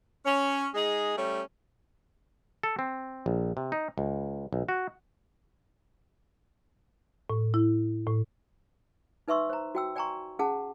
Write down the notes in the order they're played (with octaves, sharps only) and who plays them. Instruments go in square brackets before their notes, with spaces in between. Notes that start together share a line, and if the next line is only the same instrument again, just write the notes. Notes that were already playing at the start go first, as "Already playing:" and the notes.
[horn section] C#4
G#3 D#4 G#4
G3 A3 C#4
[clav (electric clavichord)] A4
C4
A#1
C3
D#4
C#2
B1
F#4
[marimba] A2
E4
A2
[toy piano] D#4 B4 E5 C6 C#6 E6
C5 A#5
F#4 G5 E6
D5 G5 G#5 A#5 C6 C#6
C#4 G#4 F#5 A5